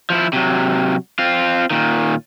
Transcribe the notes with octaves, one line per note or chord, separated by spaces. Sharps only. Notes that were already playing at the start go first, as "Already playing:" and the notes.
F3 E4
C3 F#3
C4 F4
A#2 D#3